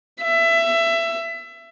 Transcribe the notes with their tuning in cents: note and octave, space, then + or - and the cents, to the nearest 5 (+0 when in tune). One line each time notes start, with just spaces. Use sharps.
E5 +20